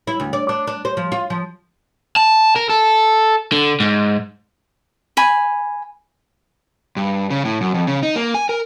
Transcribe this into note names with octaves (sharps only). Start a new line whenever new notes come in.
E4
D2
D5
D4
D4
C5
F3
F4
F3
A5
A#4
A4
D3
G#2
G#5 B5
G2
C#3
A2
F#2
F2
C#3
D#4
A#3
G#5
A#4